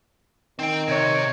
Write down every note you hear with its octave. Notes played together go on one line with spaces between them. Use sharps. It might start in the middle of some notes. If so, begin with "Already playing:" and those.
D#3 C4 G5
C3 C#5